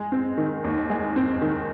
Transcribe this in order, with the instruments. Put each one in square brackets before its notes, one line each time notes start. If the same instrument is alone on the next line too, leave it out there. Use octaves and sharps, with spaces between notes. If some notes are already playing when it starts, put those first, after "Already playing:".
Already playing: [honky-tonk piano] G#3
C4
D#3
D#2
G#3
C4
D#3